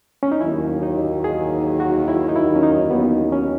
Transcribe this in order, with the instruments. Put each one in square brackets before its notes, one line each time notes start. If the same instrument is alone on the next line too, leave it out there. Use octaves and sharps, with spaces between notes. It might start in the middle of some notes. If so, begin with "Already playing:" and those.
[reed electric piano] C#4
D#4
[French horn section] D#2 D#3 F#3 [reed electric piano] E4
[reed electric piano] D#4
G#4
F#4
E4
D#4
E4
C#4
D#4
B3
C#4